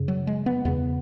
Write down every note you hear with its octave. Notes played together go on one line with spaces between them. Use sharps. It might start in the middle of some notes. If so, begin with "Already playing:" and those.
Already playing: F#2 C#3
F#3
G#3
B3
E2 C#3 B3